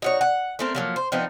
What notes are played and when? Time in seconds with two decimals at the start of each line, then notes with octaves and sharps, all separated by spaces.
0.02 D#4 F#4 C#5
0.21 F#5
0.59 A3 C4 A#4
0.75 F3 F#3 A#3
0.96 C5
1.12 F3 B3 C4 D#4